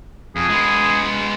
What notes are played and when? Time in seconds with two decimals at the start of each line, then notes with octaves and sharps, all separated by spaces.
0.36 F2 G#4
0.49 G#3 B3